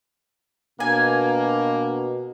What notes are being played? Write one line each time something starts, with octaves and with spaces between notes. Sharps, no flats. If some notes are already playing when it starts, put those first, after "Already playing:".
B2 A#3 D4 G#5